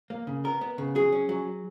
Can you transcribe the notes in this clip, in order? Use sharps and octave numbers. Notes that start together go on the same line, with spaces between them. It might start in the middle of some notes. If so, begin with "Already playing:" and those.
A#3
C#3
B3 A#4
B3
C#3
F#3 G#4
C#4
F#3